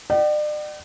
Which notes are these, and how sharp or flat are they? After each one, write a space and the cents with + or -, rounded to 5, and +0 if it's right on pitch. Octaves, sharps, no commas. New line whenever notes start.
D5 +40 G5 -45